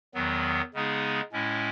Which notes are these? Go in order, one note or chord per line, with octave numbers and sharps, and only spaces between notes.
E2 D#3 F#3 B3
C#3 G#3 B3 D#4 G#4
A2 G#3 C#4 E4